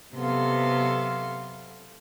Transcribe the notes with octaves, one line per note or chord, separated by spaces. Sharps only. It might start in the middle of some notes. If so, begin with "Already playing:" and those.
C3 F#3 B3 A4 F5 C6